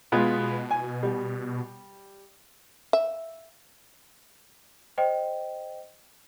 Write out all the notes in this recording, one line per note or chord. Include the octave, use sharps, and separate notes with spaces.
B2 G#3 B3 F4
G#5
G3
E5
C5 D#5 G5